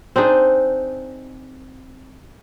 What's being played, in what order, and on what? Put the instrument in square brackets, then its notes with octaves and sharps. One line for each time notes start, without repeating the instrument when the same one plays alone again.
[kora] C4 D4 D#4 G#4